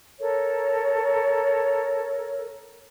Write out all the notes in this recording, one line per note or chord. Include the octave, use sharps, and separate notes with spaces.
A4 A#4 C#5